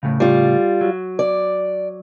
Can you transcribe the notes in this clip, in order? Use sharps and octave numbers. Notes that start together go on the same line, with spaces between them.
A2 C#3
G3 F4
F#3
D5